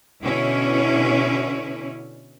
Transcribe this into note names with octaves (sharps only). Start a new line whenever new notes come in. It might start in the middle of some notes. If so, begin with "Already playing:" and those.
B2 D3 C#4 E4